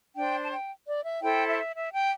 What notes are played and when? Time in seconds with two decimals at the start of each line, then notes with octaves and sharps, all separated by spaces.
0.16 D4 C5 G5
0.43 A5
0.52 G5
0.86 D5
1.04 E5
1.21 E4 A4 C5 G5
1.48 E5
1.75 E5
1.93 G5